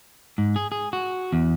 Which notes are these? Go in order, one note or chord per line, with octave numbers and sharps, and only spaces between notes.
G#2
G#4
G#4
F#4
E2